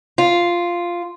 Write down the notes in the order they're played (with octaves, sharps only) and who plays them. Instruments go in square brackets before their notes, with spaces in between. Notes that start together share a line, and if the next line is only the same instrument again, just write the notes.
[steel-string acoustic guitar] F4